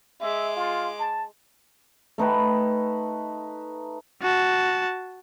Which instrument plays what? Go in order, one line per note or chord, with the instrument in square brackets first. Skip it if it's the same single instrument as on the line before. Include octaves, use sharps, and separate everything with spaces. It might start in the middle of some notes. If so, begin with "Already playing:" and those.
[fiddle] G#3 D6 [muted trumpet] E5
[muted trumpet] F4
A5
[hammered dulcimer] A3 D#4 B4 G5
[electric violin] F#4 A5